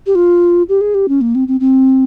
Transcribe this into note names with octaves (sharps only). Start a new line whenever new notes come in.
G4
F4
G4
G#4
G4
C#4
A#3
C4
C4
C4